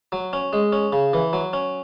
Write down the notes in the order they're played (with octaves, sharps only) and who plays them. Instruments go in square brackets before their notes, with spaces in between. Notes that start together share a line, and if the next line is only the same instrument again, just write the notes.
[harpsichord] F#3
C#4
G#3
C#4
C#3
E3
F#3
C#4